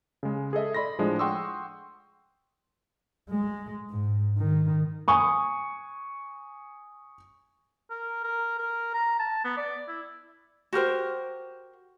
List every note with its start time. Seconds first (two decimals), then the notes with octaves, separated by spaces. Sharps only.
0.23 C#3 G#3
0.53 G#4 A4 D#5 E5
0.74 D5 D#5 B5 C6 A#6
0.98 A2 F3 G#3 D4
1.19 F#5 G5 C6 C#6 D#6 E6
3.29 G#3
3.91 G#2
4.38 D#3
5.08 G#5 C#6 D#6
7.91 A#4
8.24 A#4
8.59 A#4
8.94 A#5
9.20 A5
9.45 B3
9.57 D5
9.88 E4
10.73 F#4 G4 A#4 C5